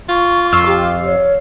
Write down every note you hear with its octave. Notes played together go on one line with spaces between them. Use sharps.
F4 C#6
F2 F5 E6 F6
G4
C#5